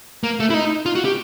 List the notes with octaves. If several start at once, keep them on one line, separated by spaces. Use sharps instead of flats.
A#3
A3
E4
D#4
F4
F#4
G4